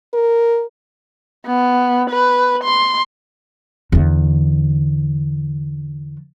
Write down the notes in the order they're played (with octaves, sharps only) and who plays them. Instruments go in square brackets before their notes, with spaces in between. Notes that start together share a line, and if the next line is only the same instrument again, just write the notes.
[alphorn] A#4
[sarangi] B3
B4
C6
[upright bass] E2 D3